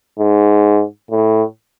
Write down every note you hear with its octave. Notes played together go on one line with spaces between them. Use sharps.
G#2
A2